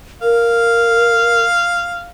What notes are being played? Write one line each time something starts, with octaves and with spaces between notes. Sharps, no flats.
A#4 F5